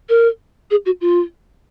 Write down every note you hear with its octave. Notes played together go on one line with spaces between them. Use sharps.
A#4
G#4
F#4
F4